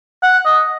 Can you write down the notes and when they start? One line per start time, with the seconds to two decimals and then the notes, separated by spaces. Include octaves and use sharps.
0.23 F#5
0.45 D#5